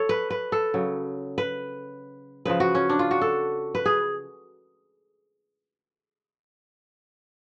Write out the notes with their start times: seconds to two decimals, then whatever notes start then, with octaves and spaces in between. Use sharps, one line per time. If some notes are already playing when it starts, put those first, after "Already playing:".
Already playing: A4 C#5
0.09 B4
0.30 B4
0.52 A4
0.74 C#3 F#3
1.38 B4
2.46 C#3 F3 B4
2.60 F#4
2.75 C#4
2.89 D4
2.99 F4
3.11 F#4
3.22 A4
3.75 B4
3.86 G#4